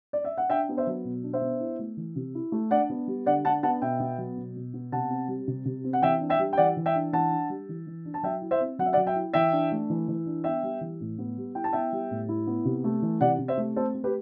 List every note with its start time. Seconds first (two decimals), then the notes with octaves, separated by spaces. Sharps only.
0.13 D5
0.25 E5
0.38 F#5
0.50 D4 E5 G5
0.69 B3
0.77 C5 E5
0.87 F#3
1.05 B2
1.23 D4
1.33 C5 E5
1.42 B3
1.60 E4
1.79 A3
1.97 E3
2.16 C3
2.35 E4
2.52 A3
2.70 D4 D5 F#5
2.90 B3
3.07 G3
3.26 D3 D5 F#5
3.45 D4 F#5 A5
3.63 B3 F#5 A5
3.82 B2 E5 G5
4.00 B3
4.18 F#3
4.37 B2
4.56 B2
4.74 B3
4.92 C3 F#5 A5
5.10 C4
5.28 G3
5.47 C3
5.65 C3
5.84 C4
5.93 F#5
6.02 E3 E5 G5
6.21 D4
6.30 E5 G5
6.39 G3
6.53 G5
6.57 E3 D5 F#5
6.77 E3
6.86 E5 G5
6.95 D4
7.12 E3 F#5 A5
7.31 D4
7.50 G3
7.69 E3
7.87 E3
8.05 D4
8.14 A5
8.23 F#3 E5 G5
8.42 E4
8.51 C5 E5
8.60 C4
8.79 F#3 F#5
8.86 E5
8.93 D5 F#5
8.97 F#3
9.07 E5 G5
9.16 E4
9.33 E3 E5 G5
9.52 D4
9.72 A3
9.90 E3
10.08 E3
10.26 D4
10.44 B3 E5 G5
10.63 G3
10.81 E3
11.00 A2
11.18 B3
11.37 G3
11.55 E4 G5
11.64 A5
11.73 B3 E5 G5
11.92 G3
12.11 A2
12.29 E4
12.47 B3
12.65 C3
12.84 A3
13.02 E3
13.21 C3 D5 F#5
13.39 C3
13.48 C5 E5
13.57 A3
13.76 C4 A4 C5
13.94 A3
14.04 G4 B4